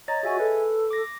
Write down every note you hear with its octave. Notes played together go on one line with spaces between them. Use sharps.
C#5 D#5 A#5 A6
F#4 G#4 E5 G#5
A4 B4
D6 A#6